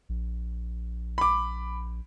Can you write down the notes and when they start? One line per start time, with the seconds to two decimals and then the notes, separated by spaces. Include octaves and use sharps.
0.09 A#1
1.18 B5 D6